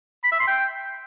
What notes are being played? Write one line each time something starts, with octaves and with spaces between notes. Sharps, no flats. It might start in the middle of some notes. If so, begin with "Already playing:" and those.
B5
E5
C6
G5